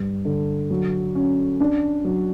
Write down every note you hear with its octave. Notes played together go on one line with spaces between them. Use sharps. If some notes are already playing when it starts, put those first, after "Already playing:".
Already playing: G2
D3
F#3
C#4
D4
F#3